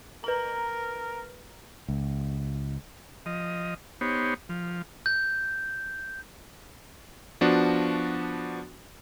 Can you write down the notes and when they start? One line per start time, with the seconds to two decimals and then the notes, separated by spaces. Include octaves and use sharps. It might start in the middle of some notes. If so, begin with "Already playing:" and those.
0.24 A#4 B4 A#5
1.88 C#2
3.26 F3 D#5
4.01 B3 D#4 G4 C5 C#5
4.49 F3
5.06 G6
7.41 F3 B3 D4 F#4